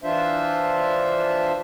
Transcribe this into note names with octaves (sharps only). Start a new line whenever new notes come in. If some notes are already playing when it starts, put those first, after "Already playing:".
E3 D4 F4 C5 E5